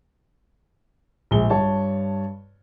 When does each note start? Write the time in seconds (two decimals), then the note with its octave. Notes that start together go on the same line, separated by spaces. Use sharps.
1.31 A#1 G#3 G7
1.50 G2 C#5 A5